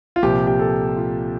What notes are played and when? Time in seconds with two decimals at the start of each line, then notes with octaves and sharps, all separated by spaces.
0.16 F4
0.23 C2 A#2 F3 G4
0.47 G4
0.59 A4
0.96 F4